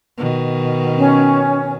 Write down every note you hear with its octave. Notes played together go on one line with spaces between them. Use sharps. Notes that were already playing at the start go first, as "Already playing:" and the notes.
B2 D#3
C#4